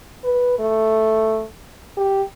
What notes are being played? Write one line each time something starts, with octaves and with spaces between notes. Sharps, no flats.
B4
A3
G4